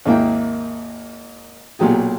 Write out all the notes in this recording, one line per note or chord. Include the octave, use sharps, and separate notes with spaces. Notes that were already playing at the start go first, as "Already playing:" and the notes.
G#1 D#2 A#3 E4 G5
B1 A#2 F#3 G4 G#4